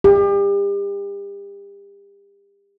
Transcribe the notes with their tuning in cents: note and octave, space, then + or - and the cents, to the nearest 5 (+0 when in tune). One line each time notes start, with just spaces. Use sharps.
G4 +35